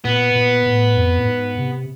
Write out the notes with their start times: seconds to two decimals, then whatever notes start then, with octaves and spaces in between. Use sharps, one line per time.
0.05 A#2 B3
0.35 A#2
0.66 A2
0.97 F2
1.19 A2
1.27 G#2
1.58 C3